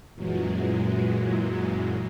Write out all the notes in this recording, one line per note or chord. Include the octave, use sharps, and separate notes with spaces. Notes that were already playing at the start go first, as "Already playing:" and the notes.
F#2 A#2 E3 F#3 G#3